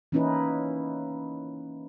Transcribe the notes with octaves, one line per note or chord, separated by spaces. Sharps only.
E3 A#3 C#4 D#4 E4 B4